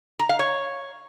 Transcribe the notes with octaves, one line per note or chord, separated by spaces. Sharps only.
A#5
F5
C#5